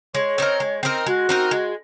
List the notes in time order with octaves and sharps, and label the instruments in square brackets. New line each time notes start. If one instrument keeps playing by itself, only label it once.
[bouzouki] G#3 [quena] C#5
[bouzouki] C4 D#4 A#4
G#3
C4 D#4 A#4
[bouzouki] G#3 [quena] F#4
[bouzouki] C4 D#4 A#4
G#3